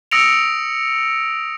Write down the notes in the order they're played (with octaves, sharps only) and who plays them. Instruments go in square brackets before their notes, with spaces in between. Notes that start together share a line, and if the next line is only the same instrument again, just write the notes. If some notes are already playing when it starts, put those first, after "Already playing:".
[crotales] D#6 E6 A#6 C#7 D7 F7